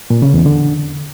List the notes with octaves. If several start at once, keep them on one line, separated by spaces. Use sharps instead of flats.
A#2
C#3
E2
D3